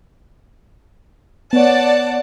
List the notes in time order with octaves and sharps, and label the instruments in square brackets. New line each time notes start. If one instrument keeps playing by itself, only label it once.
[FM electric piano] B3 C#5 [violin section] D5 F#5 A5